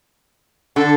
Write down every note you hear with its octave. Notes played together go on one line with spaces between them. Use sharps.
D3 A4